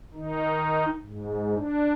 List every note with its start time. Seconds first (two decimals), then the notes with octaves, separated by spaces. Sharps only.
0.14 D#3 D#4
1.03 G#2
1.54 D4